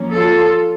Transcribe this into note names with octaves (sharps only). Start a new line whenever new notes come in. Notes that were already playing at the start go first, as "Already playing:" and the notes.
Already playing: F3 A#3 C#4
F4 A4